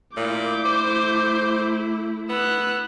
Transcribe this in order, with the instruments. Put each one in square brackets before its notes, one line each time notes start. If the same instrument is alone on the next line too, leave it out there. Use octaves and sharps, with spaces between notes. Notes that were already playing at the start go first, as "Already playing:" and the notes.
[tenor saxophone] A#2 [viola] A3 E4 [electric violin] D6 G6
[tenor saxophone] C5
[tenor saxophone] B3 [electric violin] E6 F#6